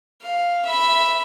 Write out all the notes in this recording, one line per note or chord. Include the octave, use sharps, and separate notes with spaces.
F5
E5 B5